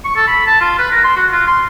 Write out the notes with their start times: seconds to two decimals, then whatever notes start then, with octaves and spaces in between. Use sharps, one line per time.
0.05 C#6
0.16 A4
0.28 B5
0.47 A5
0.61 F4
0.79 B4
0.91 A#4
1.04 C6
1.16 F#4
1.31 F4
1.47 C6